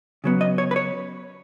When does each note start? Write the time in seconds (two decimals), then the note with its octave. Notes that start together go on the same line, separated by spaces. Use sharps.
0.24 C#3 F#3 B3
0.41 D#5
0.58 C#5
0.71 B4
0.76 C#5